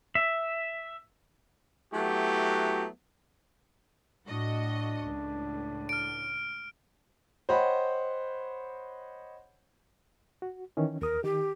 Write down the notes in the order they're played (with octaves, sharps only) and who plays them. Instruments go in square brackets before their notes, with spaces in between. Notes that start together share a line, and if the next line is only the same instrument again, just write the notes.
[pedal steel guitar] E5
[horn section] F#3 A3 B3 E4 F#4 G4
[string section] A2 F#4 D#5 [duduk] D4
[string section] C#2 A2
[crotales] F6 D7
[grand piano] C5 C#5 D#5 F#5 G5 B5
[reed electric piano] F#4
D#3 E3 C#4
[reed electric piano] D#2 D#6 [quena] A#4
[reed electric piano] D#3 [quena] G4